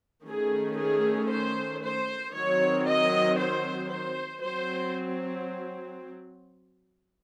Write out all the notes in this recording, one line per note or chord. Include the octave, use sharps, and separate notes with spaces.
D#3 A3 C#4 G#4
G#4
C5
C5
D#3 F#3 C4 C#5
D#5
C5
C5
F#3 C4 C5